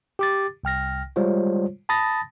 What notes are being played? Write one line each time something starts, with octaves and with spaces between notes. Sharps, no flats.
G4 D6 A6
C2 G5 F6 A#6
G3 G#3 F4 C5 C#5
A5 B5 D#6 A6 A#6